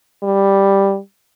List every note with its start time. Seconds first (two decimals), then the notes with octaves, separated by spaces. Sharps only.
0.23 G3